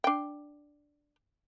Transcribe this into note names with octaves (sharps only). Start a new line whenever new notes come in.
D4 G5